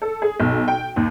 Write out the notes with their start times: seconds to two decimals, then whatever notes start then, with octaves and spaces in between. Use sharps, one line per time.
0.02 A4
0.22 G#4
0.40 B1
0.68 G5
0.96 D#2